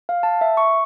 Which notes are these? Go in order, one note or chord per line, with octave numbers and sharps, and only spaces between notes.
F5
A5
E5
C#6